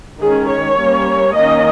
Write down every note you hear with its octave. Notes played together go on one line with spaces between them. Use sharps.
D#3 G#3 C#4 G#4
C#5
G3 A#3 C#4
D#3 A#3 C#4 D#5